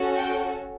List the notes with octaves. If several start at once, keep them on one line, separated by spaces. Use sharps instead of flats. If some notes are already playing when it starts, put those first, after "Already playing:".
Already playing: C#4 F#4 A4
G5